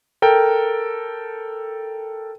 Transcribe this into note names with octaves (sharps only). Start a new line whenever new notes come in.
A4 A#4 G5